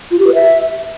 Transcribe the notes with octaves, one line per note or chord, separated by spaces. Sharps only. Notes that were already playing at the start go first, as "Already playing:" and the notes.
F4
G4
B4
E5